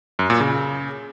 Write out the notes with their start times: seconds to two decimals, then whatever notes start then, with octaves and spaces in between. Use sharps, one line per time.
0.19 F#2
0.30 A#2
0.40 C#3